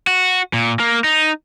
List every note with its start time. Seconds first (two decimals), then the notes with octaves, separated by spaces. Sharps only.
0.07 F#4
0.53 A#2
0.79 A#3
1.04 D#4